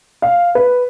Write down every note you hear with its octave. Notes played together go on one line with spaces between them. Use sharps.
F5
B4